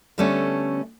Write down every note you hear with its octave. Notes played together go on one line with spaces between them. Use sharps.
D3 G3 A3 B3 C#4